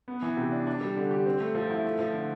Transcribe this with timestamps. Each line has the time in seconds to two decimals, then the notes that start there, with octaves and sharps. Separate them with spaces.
0.08 B3
0.22 E3
0.37 C3
0.52 D4
0.67 D4
0.81 G3
0.96 D3
1.11 G4
1.26 C4
1.40 A3
1.55 F3
1.70 E4
1.85 A3
1.99 F3
2.14 D3